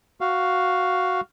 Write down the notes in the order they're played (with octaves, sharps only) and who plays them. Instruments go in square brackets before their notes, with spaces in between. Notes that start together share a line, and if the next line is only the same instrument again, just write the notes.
[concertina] F#4 F5